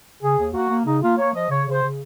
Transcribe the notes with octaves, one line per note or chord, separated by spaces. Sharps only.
C#3 G#4
D#2
A#3 F#4
A#3
C#3 D#4
A#3 F4
A#3 C#5
F3 D#5
C#3 C#5
C#3
C5
C#3